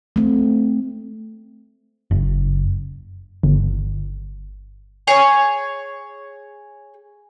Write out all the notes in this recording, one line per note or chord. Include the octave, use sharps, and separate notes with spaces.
A3 C4
F#1
G1
G#4 C#5 G#5